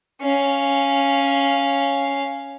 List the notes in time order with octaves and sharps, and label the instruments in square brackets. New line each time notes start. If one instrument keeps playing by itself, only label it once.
[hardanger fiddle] C#4 F5